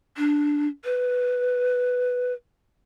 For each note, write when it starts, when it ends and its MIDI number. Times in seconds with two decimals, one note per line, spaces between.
0.17 0.67 62
0.85 2.33 71